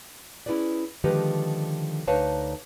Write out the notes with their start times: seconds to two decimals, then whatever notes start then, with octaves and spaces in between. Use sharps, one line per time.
0.46 C#4 E4 F4 G#4 B4 D5
1.04 D3 D#3 F3 G#3 G4 B4
2.08 D2 D#4 B4 C#5 F5 A5